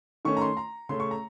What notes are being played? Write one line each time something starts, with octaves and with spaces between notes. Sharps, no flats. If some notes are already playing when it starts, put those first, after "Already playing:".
D#3 A3 C#4 C#6
A#5
C6
A#5
C#3 A3 C#4 C6
C#6
A#5